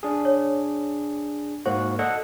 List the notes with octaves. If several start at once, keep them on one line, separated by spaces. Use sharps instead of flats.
D4 G#4
C#5
G#2 A#3 F#4 C5
A4 D5 D#5 F#5